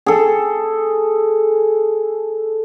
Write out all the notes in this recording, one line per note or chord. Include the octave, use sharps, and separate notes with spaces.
G#4 A4